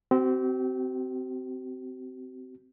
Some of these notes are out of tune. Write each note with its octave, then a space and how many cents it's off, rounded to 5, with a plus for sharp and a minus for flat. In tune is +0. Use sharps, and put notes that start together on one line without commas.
C4 -15 F#4 +45